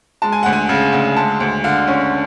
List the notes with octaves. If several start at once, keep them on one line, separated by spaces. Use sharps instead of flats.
G#3 A5
G#5
D2 F#5
G#5
C#3
D2
G#3 A5
D2
D3 F5
C#4